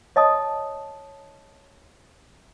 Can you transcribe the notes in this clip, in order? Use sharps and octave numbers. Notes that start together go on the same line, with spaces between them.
C#5 D#5 A5 D#6